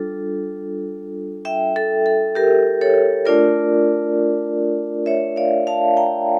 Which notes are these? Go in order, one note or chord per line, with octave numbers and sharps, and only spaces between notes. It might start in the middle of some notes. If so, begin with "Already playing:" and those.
Already playing: G3 D4 F4 A4
E5 G5
A4
A4
G4 A#4
A4 C#5
A3 D4 F4 A#4 D5
C#5 E5
D5 F5
F5 A5
G5 A#5